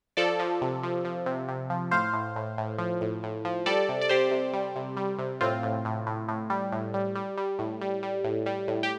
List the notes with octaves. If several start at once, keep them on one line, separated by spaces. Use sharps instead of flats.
F3 A4 D5
F3
C3
F3
F3
C3
C3
F3
A2 C5 F5
A2
A2
A2
F3
A2
A2
F3
G3 A4 D5
C3
D5
C3 G4 C5
C3
G3
C3
G3
C3
A2 C4 F4
A2
A2
A2
A2
G3
A2
G3
G3
G3
A2
G3
G3
A2
G3
A2
G4